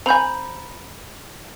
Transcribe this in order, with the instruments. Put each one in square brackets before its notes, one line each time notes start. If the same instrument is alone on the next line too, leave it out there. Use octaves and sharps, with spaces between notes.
[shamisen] C4 G#5 [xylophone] A#5 B5 G6